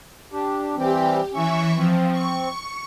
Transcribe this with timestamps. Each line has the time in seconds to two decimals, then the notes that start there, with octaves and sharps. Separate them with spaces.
0.32 D4 G4
0.76 E3 G3 C4 G4
1.32 E3 C#4 E5 C#6
1.76 F3 C4
2.11 C#6